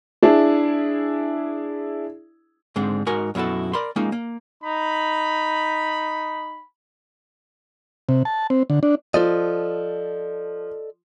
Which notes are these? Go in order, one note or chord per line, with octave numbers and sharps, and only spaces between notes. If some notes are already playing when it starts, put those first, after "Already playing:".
D4 E4 G#4
G#2 D3 G#3 C4 D4
G#2 D#4 F#4 A#4 G#5
F#2 B2 E4 F#4 A4
A#4 D5 B5 C6
G#3 A#3 C#4 D#4 F4
A#3
D#4 B5
C3
A5
C4
D3
D4
F3 A4 D5 D#5